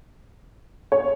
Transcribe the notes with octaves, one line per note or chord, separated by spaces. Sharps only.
C#5